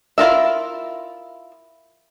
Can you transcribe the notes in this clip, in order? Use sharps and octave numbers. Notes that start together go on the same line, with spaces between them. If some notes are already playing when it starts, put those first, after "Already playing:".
E4 F4 A#4 E5